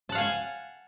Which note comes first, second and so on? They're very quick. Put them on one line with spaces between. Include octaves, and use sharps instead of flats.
A5 F#5 F5 G#5